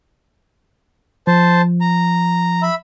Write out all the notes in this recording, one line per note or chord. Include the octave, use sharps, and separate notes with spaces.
F3 C5 A5
A#5
E5 B5